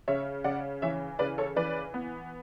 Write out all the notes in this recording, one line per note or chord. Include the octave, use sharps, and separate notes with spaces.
C#3 C#5 E5
C#3 D5 F#5
E3 C#5 E5
C#3 B4 D5
A4 C#5
E3 B4 D5
B3